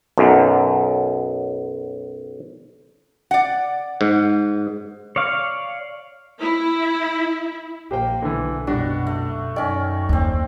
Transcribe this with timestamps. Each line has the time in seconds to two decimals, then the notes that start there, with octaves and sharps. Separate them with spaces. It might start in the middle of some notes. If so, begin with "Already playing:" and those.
0.18 B1 F#2
3.31 D5 F#5
4.01 G#2
5.16 C#5 D5 F5
6.42 E4
7.91 A#1 A#3 G4 C5 G5
8.22 B1 D3 E3
8.67 F#1 B2 G3 D4 F#4
9.07 A3
9.56 F#2 D#3 C#4 D5
10.09 D#2 C4 D4